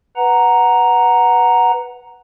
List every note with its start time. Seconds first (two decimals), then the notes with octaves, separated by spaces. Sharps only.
0.16 B4 F#5 A#5